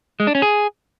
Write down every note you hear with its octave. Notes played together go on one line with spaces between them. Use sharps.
G#3
D4
C#4
G#4